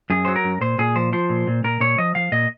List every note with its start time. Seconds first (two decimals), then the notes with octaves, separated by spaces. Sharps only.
0.10 F#2 G#4
0.25 F#3 C5
0.36 A#4
0.44 F#2
0.61 A#2 C5
0.78 A#2 G#4
0.96 F3 C5
1.13 F3 C5
1.29 A#2
1.47 A#2
1.64 A#2 A#4
1.80 A#2 C#5
1.98 F3 D#5
2.15 F3 F5
2.32 A#2 D#5